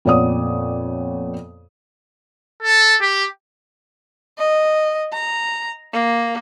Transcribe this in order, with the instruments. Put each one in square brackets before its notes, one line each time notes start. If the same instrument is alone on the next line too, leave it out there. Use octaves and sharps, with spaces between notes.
[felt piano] F2 A#2 B3 C#5 D5 D#6
[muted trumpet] A4
G4
[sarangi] D#5
A#5
A#3